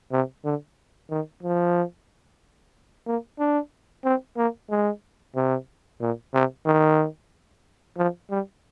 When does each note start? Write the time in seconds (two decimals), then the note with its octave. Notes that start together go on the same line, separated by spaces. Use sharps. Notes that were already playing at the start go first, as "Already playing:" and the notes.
0.12 C3
0.44 D3
1.10 D#3
1.43 F3
3.06 A#3
3.39 D4
4.04 C4
4.37 A#3
4.70 G#3
5.35 C3
6.01 A#2
6.34 C3
6.66 D#3
7.97 F3
8.30 G3